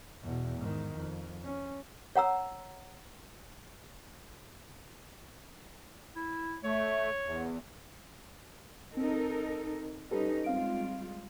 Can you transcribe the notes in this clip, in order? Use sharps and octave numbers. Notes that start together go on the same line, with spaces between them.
E2 B2
G#2 D#3
F2
C#4
C#5 F#5 A#5 E6
E4
A3 C#5
E2
C4 D#4 A4 A#4
G3 C#4 D#4 G4 A4 B4
G3 G#3 C4 F4 F5 D7